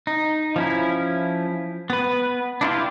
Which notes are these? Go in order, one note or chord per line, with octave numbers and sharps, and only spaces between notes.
D#4
F3 C#4 E4
B3 B4
D4 E4 F4 G4